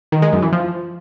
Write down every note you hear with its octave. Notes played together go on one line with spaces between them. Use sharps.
D#3
G#3
F#2
E3
F3